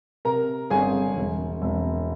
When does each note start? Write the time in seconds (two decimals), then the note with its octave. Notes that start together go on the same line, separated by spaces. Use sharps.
0.25 C3 A#4 A#5
0.70 G1 G#4 G#5
1.16 E1
1.62 E1